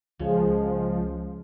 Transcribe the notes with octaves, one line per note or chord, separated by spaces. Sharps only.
C#2 C#3 F3 G#3